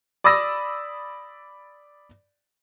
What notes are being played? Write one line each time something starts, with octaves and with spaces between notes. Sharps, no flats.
D5 B5 D#6 E6 A#6